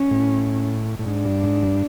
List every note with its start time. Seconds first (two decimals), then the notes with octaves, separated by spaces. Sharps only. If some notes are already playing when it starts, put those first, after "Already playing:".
Already playing: C#4
0.11 A2
0.99 A2
1.06 G#2 D4
1.25 G2
1.43 G#2
1.63 G2